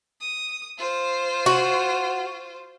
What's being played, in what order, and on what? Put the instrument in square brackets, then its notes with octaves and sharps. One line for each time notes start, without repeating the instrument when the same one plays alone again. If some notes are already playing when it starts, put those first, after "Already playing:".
[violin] D#6
F4 C5
[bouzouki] F#4